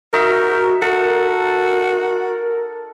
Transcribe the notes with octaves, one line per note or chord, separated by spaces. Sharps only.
D#4 F#4 A#4 E5
F#4 A4 A#4